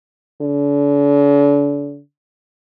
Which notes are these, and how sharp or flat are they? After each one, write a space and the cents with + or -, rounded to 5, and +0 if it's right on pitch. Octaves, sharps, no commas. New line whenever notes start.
D3 -40